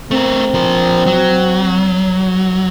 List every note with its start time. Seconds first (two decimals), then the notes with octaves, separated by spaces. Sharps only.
0.11 A3 C4 A#4
0.54 F3 A#4
1.06 F#3